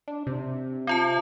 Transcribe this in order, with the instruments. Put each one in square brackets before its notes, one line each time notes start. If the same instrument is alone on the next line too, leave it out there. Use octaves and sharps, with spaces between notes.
[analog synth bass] D4
C3
[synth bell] C4 F4 A5